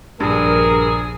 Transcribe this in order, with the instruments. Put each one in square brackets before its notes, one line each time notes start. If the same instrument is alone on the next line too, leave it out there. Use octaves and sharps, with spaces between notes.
[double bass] A#1 [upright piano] G2 [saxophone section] G#4 [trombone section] A#4